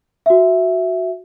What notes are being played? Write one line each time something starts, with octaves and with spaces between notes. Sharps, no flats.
F#4 E5